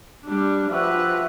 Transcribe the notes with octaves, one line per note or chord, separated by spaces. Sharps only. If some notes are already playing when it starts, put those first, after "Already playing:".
G3 D4
F3 F#4 G4 B4 E5